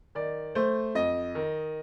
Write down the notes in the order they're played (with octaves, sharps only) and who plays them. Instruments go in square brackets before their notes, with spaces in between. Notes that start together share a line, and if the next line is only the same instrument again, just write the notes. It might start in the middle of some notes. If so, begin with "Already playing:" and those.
[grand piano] D#3 D5
A3 C5
F2 D#5
D#3